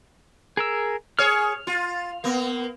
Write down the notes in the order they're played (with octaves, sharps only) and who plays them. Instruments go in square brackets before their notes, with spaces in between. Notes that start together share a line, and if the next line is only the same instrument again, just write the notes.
[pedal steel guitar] G#4 A#4 E6
[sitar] G#4 C#5 [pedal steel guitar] F6
[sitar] F4
A#3 B3